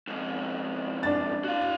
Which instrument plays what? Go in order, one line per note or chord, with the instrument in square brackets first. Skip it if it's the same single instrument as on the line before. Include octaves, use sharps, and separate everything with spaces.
[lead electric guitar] F2 G#2
[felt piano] D4 A6
[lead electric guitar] F#4 F5